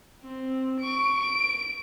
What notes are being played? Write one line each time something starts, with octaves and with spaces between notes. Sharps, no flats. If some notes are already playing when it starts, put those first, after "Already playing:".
C4
C#6 D7
D7